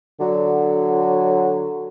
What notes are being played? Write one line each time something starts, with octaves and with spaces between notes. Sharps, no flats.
D3 F#3